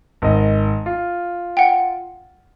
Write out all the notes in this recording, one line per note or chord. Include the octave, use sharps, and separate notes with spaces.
G#1 D#5
F4
F#5 G5